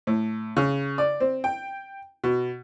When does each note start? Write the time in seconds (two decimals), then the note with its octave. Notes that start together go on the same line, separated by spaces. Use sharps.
0.07 A2
0.57 C#3
0.98 D5
1.20 C4
1.44 G5
2.24 B2